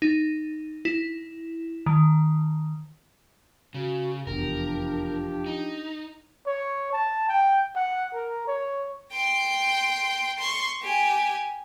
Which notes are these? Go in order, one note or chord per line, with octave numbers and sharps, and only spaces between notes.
D#4
E4
D#3
C#3 F#4
F1 E2 F3 D4 G4 A#4
D#4
C#5
A5
G5
F#5
A#4
C#5
G5 C6
C6 C#6
G4 G#5